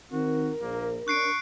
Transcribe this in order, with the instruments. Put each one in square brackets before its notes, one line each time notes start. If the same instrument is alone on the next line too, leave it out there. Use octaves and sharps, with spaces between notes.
[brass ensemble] D#3 C4 [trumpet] F#4 [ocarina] A#4
[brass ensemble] A#1 [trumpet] A#3
[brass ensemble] C#4 D4 [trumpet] C#6 [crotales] F#6 C7 D7